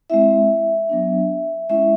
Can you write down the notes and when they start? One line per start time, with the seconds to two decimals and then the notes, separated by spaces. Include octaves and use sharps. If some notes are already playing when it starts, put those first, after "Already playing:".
0.10 G#3 C4 E4 E5
0.89 F#3 B3 D4
1.69 G#3 C#4 E4 E5